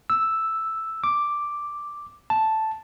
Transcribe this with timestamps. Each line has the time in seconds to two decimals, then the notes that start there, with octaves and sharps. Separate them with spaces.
0.10 E6
1.04 D6
2.30 A5